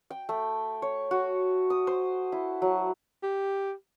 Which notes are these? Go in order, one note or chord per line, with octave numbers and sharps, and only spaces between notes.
G5
A3
C#5
F#4
D#6
C5
E4
F#3
G4